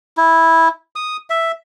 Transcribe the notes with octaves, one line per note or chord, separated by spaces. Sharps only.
E4
D#6
E5